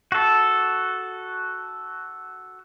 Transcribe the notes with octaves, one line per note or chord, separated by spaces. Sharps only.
F#4 A4